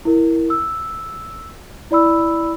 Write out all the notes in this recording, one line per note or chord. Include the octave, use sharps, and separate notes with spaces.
E4 A#4
E6
E4 D5 B5 E6